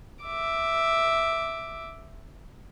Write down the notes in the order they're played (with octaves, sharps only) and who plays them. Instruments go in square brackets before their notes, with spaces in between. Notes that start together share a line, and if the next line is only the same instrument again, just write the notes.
[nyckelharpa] E5 D6